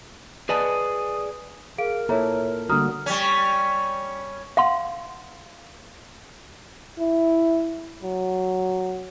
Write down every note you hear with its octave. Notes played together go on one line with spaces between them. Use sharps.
G#4 B4 D5 D#5 G#5 A5 D#6
G#4 A#4 F5 D7
A#2 E4 A4 C#5 E5 A#5
D2 G2 D3 A#3 F#4 A#5 D#6 F6
G3 C#4
F5 F#5 C6
E4
F#3